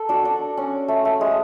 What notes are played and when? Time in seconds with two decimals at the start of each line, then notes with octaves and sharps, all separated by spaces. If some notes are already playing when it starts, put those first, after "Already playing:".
Already playing: A4
0.09 D4 F#4
0.25 D4
0.57 C#4
0.88 A3
1.05 A3
1.21 G#3